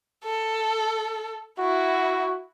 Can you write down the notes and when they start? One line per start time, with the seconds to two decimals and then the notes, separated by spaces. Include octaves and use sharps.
0.24 A4
1.59 E4 F#4